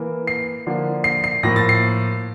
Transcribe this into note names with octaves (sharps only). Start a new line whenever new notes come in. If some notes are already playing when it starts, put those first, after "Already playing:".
Already playing: E3 A#3
C7
D3 F3 A#3
C7
C7
A2 F3 A#3 A#6
A6
C7